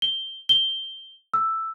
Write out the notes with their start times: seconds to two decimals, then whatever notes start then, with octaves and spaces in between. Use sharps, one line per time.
0.02 G7
0.49 G7
1.34 E6